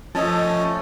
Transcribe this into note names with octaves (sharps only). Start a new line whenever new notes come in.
F3 A3 C#4 D#5 A5